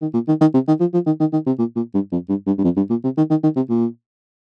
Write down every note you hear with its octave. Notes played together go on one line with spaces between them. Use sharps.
D#3
A#2
D#3
D#3
C3
D#3
F3
F3
D#3
D#3
D#3
C3
A#2
A#2
G2
F2
G2
G2
G2
F2
G2
A#2
C3
D#3
D#3
D#3
C3
A#2